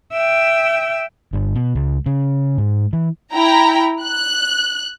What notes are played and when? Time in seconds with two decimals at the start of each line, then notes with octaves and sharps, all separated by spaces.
0.14 E5 G5
1.33 G1
1.55 B2
1.75 C#2
2.06 C#3
2.58 G#2
2.93 E3
3.32 E4 G5 A#5
4.02 F#6